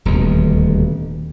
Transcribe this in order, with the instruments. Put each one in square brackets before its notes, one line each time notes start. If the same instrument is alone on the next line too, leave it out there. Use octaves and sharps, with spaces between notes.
[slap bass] D#1 D2 B2